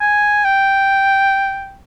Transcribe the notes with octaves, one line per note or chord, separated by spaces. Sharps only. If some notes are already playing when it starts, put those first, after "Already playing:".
G#5
G5